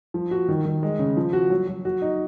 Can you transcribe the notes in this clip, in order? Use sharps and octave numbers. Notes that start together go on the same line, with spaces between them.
F3
F#4
D#3
D#3
G#3
C#3
F3
F#4
F#3
F#3
F#4
D#4